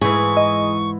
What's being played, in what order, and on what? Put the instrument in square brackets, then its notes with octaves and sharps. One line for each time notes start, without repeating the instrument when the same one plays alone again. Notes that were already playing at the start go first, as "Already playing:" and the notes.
[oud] G#2 E3 [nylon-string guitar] G#4 [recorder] C#6
[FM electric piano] D#5